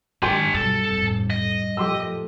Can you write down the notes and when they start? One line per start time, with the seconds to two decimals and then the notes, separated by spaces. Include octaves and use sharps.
0.22 G#2 D#3 D4 G4 G5 G#5 C6
0.54 B1 G2 A4
0.91 F1 A2
1.30 D#5
1.77 A#2 F3 A3 G4 C6 E6